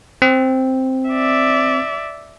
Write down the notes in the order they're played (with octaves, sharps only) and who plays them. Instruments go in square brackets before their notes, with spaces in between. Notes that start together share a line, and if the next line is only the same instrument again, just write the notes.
[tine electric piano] C4
[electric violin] D5 E5